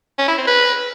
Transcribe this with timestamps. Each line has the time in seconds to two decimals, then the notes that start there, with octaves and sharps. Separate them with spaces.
0.19 C#4
0.28 E4
0.38 C4
0.47 B4